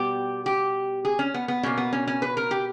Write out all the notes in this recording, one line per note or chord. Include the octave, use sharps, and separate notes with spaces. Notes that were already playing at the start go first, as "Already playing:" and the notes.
Already playing: B2 G3 B3 G4
G4
G#4
C#4
B3
B3
B2 A#3 C#4
B3
C#4
C#4
B4
A#4
G4